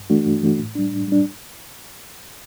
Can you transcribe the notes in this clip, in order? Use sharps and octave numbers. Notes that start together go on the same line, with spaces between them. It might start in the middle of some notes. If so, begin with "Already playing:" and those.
Already playing: G2
E3 A3 D4 F#4
G2
E3 A3 D4 F#4
A2
G3 D4
A2
G3 D4